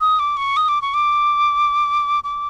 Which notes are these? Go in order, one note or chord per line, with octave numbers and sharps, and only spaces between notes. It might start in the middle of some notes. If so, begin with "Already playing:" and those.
D#6
D6
C#6
D#6
D6
C#6
D6
D6